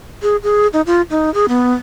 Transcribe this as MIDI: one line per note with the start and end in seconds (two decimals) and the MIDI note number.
0.22 0.36 68
0.43 0.67 68
0.73 0.81 63
0.87 1.02 65
1.10 1.32 63
1.34 1.46 68
1.49 1.72 59